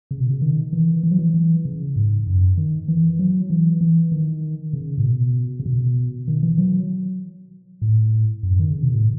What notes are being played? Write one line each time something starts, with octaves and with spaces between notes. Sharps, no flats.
C#3
B2
C#3
D#3
E3
E3
F#3
E3
E3
C#3
G#2
F#2
D#3
E3
F#3
E3
E3
D#3
C#3
A2
B2
C#3
B2
D#3
E3
F#3
A2
F#2
D#3
C#3
B2
A2